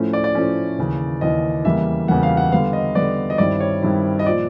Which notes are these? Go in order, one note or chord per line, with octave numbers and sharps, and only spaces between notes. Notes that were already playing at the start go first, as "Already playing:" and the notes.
Already playing: A2 F3 A3 C#4
D5
D5
A2 F3 A3 C#4
D#2 C#3 E3
D#2 C#3 E3 D#5
E2 C#3 E3 G3 A#3 E5
E2 C#3 E3 G3 A#3 F#5
F5
F#5
D3 G3 B3 F5
D#5
D3 G3 B3 D5
D#5
G2 D#3 G3 C4 E4 D5
C#5
G2 D#3 G3 C4 E4
D#5
A#2 F3 D5